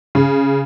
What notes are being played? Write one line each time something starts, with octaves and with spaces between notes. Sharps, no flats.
C#3